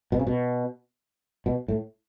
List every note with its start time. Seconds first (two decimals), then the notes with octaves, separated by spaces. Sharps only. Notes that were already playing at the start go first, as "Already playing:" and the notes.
0.12 B2
0.19 C#3
0.27 B2
1.46 B2
1.68 A2